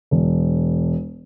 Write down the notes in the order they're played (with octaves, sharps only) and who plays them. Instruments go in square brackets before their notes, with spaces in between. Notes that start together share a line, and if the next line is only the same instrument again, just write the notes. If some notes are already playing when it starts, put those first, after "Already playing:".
[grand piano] E1